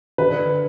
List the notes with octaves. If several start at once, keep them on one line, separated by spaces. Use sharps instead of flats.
D3 B4